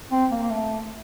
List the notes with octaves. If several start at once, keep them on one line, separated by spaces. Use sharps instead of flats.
C4
A#3
A#3
A3